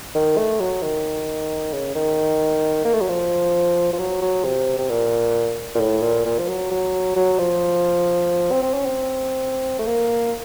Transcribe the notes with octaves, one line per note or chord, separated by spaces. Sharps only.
D#3
A3
F#3
D#3
C#3
D#3
A#3
A3
F#3
F3
F3
F#3
F#3
C3
C3
A#2
A#2
A2
A#2
A#2
F3
F#3
F#3
F#3
F3
C4
C4
C#4
C4
A3
A#3